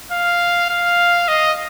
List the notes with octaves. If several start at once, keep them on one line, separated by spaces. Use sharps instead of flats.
F5
F5
D#5